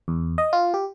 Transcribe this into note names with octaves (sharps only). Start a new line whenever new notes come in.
E2
D#5
F4
G4